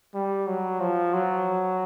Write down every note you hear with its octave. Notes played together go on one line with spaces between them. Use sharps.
G3
F#3
F3
F#3